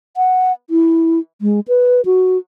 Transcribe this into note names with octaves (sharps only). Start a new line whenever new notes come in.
F#5
E4
G#3
B4
F#4